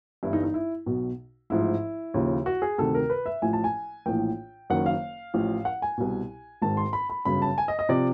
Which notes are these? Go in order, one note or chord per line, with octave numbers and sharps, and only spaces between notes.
G1 G2 E3 E4
D#4
D#4
E4
B1 B2
A1 G#2 F3 E4
D#2 C#3 F3
F#4
G#4
D2 C3 D#3 A4
A#4
B4
E5
A1 A2 F3 G#5
A5
G#5
A#1 A2 E3 G5
F#1 F#2 D#3 F#5
F5
A1 A2 F3
F#5
G#5
C2 B2
G#1 G#2 D#3 A5
C6
B5
B5
G1 F#2 C#3 B5
A5
G#5
D#5
D#5
C3 F3 D5